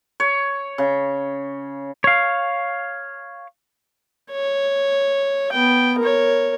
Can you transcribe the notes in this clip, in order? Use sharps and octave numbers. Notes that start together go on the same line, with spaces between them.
C#5
C#3
C#5 F5
C#5
B3 G5
A#4 C#5